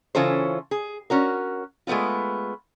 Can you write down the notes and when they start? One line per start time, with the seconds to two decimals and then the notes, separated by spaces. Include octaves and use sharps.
0.15 C#3 E3 C#4 F4 A4 C5
0.71 G#4
1.10 C#4 F#4 A#4
1.87 G#3 A3 B3 C4 F4